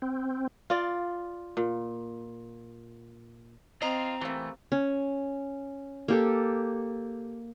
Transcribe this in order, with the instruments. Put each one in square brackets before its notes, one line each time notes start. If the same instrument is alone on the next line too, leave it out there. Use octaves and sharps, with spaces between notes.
[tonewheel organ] C4
[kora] F4 D5
A#2
[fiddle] C4 [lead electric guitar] F4 [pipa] D#5 [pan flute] A#5
[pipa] C3 A#3 [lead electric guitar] E3 A3
[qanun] C#4
A#3 G4 A4